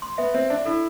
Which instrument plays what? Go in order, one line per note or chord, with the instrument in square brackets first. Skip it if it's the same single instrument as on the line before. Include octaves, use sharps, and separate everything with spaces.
[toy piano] C6
[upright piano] B3 [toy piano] E5
[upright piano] C4 [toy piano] E5
[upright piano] D4 [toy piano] E5
[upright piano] E4 [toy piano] A4